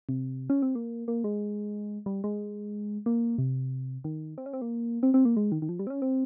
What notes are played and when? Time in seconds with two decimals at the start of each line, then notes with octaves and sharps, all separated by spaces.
0.09 C3
0.50 C#4
0.62 C4
0.75 A#3
1.08 A#3
1.24 G#3
2.06 G3
2.24 G#3
3.06 A#3
3.38 C3
4.04 D#3
4.38 C4
4.46 C#4
4.53 C4
4.62 A#3
5.03 C4
5.14 C4
5.25 A#3
5.37 G#3
5.52 D#3
5.62 D#3
5.69 F3
5.79 G3
5.87 C4
5.90 C#4
6.02 C4